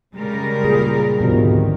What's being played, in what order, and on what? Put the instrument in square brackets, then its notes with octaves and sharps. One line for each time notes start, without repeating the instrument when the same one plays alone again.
[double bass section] C#3 [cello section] G3 G#3 A#4
[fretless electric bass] A#2 [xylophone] G#4
[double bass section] G#1 D2 D#3 [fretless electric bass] B2 F3 G3